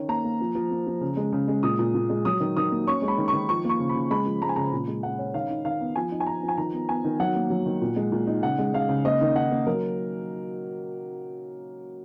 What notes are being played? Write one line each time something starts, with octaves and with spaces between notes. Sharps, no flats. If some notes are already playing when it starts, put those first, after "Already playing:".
Already playing: D#3 C#4
A#3 A#5
A#3
F3
F3
A#3
F3
C#3
G#3
C#3
G#3
A#2 D#6
A#2
A#2
G#3
F#3 D#6
D#3
D#3 D#6
A#3
C#4 C#6
G#3
B5
D#3
C#6
D#3
F3 C#6
A#3 C#6
C#3
B5
C#3
G#3 B5
F3
G#3 A#5
G#5
C#3 A#5
A#2
G#3
G#3 F#5
C#4
D#3 F5
D#4
D#3 F5
B3
F3 G#5
D#4
G#5
F3 A#5
F3
G#5
D#3 A#5
B3
B3 G#5
D#3
F#3 F#5
A#3
F#3
D#3
A#2
G#3
A#2
D#4
C#3 F#5
G#3
G#3 F5
C#3
A#3 D#5
D#3
D#4 F#5
A#3
F#3 A#4